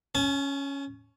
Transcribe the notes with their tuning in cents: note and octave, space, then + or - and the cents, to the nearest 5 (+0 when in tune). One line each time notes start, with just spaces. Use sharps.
C#4 +0 G#5 +45